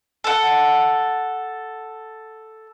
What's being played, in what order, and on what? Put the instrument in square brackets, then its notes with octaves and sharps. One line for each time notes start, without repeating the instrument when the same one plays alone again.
[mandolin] A4 F#5